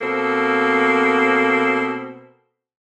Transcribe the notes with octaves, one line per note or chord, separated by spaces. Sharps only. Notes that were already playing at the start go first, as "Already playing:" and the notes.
B2 A#3 C4 A4